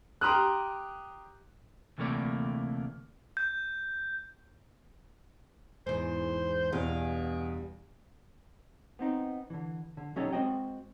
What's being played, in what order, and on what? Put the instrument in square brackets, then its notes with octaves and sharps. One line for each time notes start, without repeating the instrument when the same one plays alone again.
[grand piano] G4 A#5 C6 D#6 F6 F#6
[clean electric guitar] D2 C3 E3 A3 A#3 D5
[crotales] G6
[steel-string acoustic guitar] E2 G#2 [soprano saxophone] C5
[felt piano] E2 B2 [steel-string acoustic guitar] G2 F5 [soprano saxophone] G#4
[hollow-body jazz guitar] B3 C4 D#4
D3 E3
D3
B2 F#3 C#4 D#4 G4 A4
G#3 C4 F#4 D#5 G5